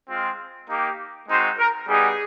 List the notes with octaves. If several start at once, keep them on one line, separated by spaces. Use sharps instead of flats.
G#3 C4 F4
A#3 D#4 G4
G#3 C4 D#4 F#4 C5
A#4
G3 B3 D#4 G#4